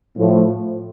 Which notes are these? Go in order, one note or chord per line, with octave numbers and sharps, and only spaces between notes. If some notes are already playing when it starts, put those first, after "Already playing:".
A2 F3